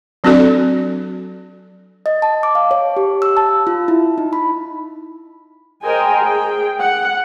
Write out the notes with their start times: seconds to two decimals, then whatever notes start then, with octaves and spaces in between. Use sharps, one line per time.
0.24 F#3 C4 D4 F#4 A4 D5
2.06 D#5
2.22 A5
2.43 D6
2.55 F5
2.71 C#5
2.96 G4
3.22 E6
3.37 A5
3.67 F4
3.88 E4
4.18 D#4
4.33 B5
5.83 G#4 A#4 C5 D#5 G5 G#5
6.24 G#4 G5
6.80 F#5